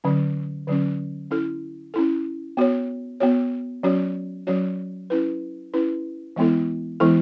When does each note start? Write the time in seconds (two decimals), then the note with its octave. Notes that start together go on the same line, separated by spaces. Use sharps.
0.04 D3 F#3 C#4
0.67 D3 F#3 C#4
1.31 C#4 E4 A4
1.94 C#4 E4 A4
2.57 B3 F#4 C#5
3.20 B3 F#4 C#5
3.83 F#3 C#4 F#4 C#5
4.47 F#3 C#4 F#4 C#5
5.10 C#4 E4 B4
5.74 C#4 E4 B4
6.36 E3 G#3 B3 E4 A4
7.00 E3 G#3 B3 E4 A4